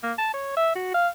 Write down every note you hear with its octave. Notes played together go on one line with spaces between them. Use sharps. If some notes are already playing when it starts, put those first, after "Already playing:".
A#3
A5
C#5
E5
F#4
F5